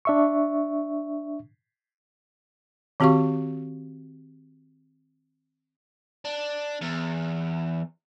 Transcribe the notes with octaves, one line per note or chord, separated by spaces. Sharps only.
D4 E5 C#6
D#3 C4 F#4 G4 F5 C#6
D4
E2